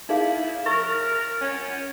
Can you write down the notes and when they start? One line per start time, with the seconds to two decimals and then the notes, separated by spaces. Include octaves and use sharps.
0.09 D#4 E4 G#4 F5
0.66 A#4 C#6
1.41 C#4